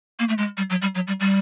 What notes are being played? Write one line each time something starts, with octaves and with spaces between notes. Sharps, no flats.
A#3
A3
G#3
G3
F#3
G3
F#3
G3
G3